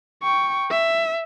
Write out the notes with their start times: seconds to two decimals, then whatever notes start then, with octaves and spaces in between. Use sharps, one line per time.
0.22 G5 C#6
0.71 E5